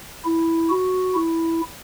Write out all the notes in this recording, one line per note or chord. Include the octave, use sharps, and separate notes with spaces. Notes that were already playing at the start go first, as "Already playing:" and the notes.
E4
F#4
E4